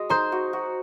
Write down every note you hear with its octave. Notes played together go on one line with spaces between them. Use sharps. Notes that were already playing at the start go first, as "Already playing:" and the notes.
Already playing: G#3 F#4 D#5
D#4 C5
F#4
F#4